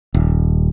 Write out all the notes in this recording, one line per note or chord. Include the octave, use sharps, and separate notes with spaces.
D#1